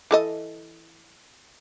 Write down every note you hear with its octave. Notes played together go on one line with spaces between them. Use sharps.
E3 A4 D#5